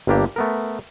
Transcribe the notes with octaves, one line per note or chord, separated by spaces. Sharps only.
G1 G2 A#3 D4 G4
A3 B3 A#4